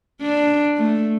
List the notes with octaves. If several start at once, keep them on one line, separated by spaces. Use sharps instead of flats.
D4
A3